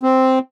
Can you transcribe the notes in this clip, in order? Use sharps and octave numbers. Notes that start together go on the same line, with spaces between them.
C4